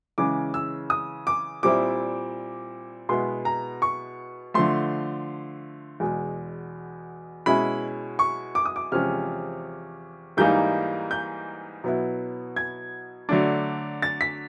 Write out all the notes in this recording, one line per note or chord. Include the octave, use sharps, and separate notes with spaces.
C#3 E3 G#3 C#4 D6
E6
D#6
D6
A#2 G3 C4 E4 D6
B2 G#3 B3 E4 C6
A#5
C#6
D3 F3 A3 C6
E2 B2 G#3
B2 G#3 C#4 E4 B5
C#6
D6
D#6
D6
E2 C3 F3 G#3 C#4 F6
G#2 E3 G3 A#3 D#4 G6
G6
B2 F#3 B3 E4
G#6
D3 F#3 A3 D4
A6
B6